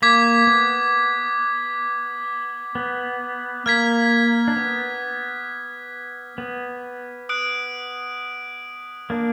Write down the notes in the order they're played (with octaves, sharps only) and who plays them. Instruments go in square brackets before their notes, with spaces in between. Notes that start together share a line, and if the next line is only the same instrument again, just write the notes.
[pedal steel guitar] A#3 [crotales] D6 G#6 B6
[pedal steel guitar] B3
B3
[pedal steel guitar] A#3 [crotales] F6 G#6 B6
[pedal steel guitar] D4
B3
B3
[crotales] D#6 F#6 D7
[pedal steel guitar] A#3 D4